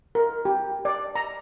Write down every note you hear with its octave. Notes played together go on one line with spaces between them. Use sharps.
A#4
G4
D5
A#5